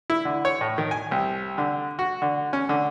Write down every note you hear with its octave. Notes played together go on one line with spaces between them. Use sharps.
E4
D3
C#5
A2
D#3
G#5
C2
D3
F#4
D3
C#4
D3